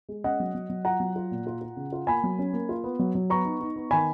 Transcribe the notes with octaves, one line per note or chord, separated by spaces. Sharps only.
G#3
C#4 D#5 F#5
F#3
F#3
F#3
F4 F#5 A#5
F#3
F4
A#2
F4
F4
C#3
F4
A#3 G#5 B5
F#3
C#4
A#3
F4
B3
F#3
F#3
B3 A#5 C#6
D#4
D#4
B3
D#3 G#5 B5